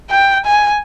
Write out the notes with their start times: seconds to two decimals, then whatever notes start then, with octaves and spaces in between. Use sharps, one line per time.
0.10 G5
0.46 G#5